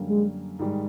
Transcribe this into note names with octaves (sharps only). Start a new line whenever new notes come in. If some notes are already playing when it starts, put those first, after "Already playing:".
Already playing: F#2 D3 G3 A#3
G#3
G#2 D#3 G3